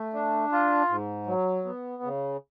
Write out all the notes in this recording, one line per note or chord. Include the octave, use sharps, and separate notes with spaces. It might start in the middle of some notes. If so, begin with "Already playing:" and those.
Already playing: A3
D4
F4
G#2
F#3
B3
C#3